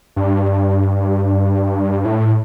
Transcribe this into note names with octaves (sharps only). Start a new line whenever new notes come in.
G2
A2